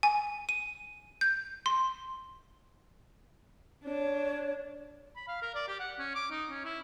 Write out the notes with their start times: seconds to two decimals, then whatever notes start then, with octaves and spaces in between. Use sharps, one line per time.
0.03 G#5
0.49 D#7
1.21 G6
1.66 C6
3.85 D4 C#5
5.16 B5
5.28 F5
5.42 A#4
5.55 D5
5.68 G4
5.80 F#5
5.99 C#4
6.15 D6
6.31 D#4
6.50 C#4
6.65 E4